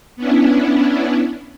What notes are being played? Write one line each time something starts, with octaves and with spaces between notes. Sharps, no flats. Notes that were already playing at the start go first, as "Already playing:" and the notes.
B3 C#4 D4 E4